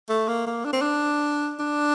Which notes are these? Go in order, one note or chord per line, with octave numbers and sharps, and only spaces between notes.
A3
A#3
A#3
D4
C4
D4
D4